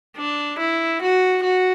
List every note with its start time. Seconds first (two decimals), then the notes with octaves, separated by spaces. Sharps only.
0.18 D4
0.59 E4
1.02 F#4
1.44 F#4